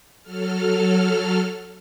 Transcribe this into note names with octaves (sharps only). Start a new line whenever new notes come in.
F#3 A4 F6